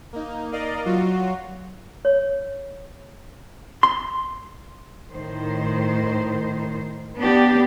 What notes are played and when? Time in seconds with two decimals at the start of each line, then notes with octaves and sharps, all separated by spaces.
0.13 A#3 D#4
0.52 A#4 D5 D#5 F5
0.85 F#3 F4 F#4
2.05 C#5
3.83 C6
5.11 A2 D#3 C5
7.18 B3 D4 G4